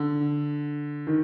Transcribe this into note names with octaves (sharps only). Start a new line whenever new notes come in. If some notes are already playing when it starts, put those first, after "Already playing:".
Already playing: D3
D#3